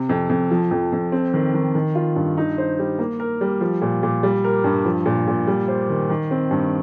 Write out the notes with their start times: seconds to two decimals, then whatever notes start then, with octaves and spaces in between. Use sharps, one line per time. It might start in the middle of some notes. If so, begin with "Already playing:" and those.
Already playing: C3
0.09 F2
0.29 F2
0.51 F3
0.71 F2
0.92 F2
1.12 C4
1.33 D#3
1.54 D#3
1.75 D#3
1.95 F4
2.16 G2
2.37 D#4
2.58 C5
2.79 G3
2.99 A#3
3.20 A#4
3.41 G3
3.61 F3
3.82 A#2
4.03 A#2
4.23 G3
4.44 A#4
4.64 G2
4.85 F3
5.06 A#2
5.28 A#2
5.47 G3
5.68 C5
5.90 D#3
6.09 D#3
6.31 C4
6.51 G2